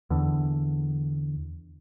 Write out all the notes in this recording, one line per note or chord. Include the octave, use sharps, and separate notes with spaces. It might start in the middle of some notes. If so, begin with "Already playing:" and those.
E2 D3